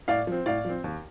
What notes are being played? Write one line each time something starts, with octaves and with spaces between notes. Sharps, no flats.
A2 D5 F5
F3 C4
A2 D5 F5
F3 C4
D#2